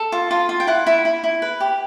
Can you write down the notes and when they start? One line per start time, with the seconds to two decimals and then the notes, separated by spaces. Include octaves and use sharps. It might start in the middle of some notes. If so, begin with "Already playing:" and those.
Already playing: A4
0.12 F4
0.31 F4
0.49 F4
0.60 G5
0.67 E4 F#5
0.87 E4
1.05 E4
1.24 E4
1.42 B4
1.60 G4